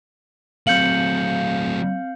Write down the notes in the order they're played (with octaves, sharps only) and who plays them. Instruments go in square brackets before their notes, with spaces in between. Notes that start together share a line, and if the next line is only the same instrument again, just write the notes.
[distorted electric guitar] F#3 A3 [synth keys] C4 F5 [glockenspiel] G6 C#7 F#7